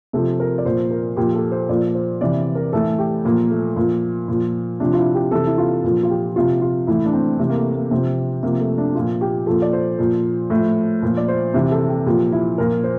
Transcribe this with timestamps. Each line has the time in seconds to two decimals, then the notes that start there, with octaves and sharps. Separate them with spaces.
0.13 C3 F3 A4
0.40 A#4
0.58 D5
0.65 A#2 F3 C5
0.91 A#4
1.17 A#2 F3 G4
1.35 A4
1.52 C5
1.69 A#2 F3 D5
1.95 C5
2.21 C3 E3 D5
2.55 A#4
2.73 A2 E3 A4
2.99 G4
3.25 A#2 F3 A#3
3.50 A3
3.76 A#2 F3
4.28 A#2 F3
4.80 C3 F3 D4
4.93 F4
4.97 E4
5.14 G4
5.31 C3 E3 A4
5.47 E4
5.58 F4
5.84 A#2 F3
6.03 F4
6.10 G4
6.36 C3 F3 F4
6.62 F4
6.87 A2 E3 E4
7.05 D4
7.13 C4
7.39 C3 E3
7.50 A#3
7.57 A3
7.74 A#3
7.91 C3 F3 C4
8.43 C3 F3 A#3
8.60 A3
8.78 D4
8.95 A#2 F3 F4
9.21 G4
9.46 A#2 F3 A4
9.62 D5
9.73 C5
9.99 A#2 F3
10.50 A2 F3
11.02 A#2 F3
11.17 D5
11.28 C5
11.54 C3 E3
11.71 A4
11.88 G4
12.06 A#2 F3 G4
12.32 E4
12.58 A#2 F3 A#4
12.84 C5